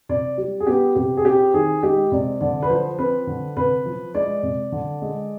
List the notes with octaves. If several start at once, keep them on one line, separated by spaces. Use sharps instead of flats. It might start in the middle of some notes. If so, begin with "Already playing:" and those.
C3 D5
G3
G#4
B3 G4
C3 G4
G#4
C4 G4
D#3 G#4
G#3 G4
C3 D5
D3 D5
B4
F3 C5
C4 B4
D3
C3 B4
F3
G#3 D5
C3
D3
G#3